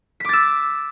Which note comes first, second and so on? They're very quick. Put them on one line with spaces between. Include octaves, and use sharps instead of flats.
B6 D6 A6 E6